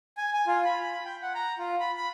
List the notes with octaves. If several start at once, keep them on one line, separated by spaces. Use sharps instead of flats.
G#5
G#5
F4
B5
B5
G5
F#5
A#5
F4
B5
B5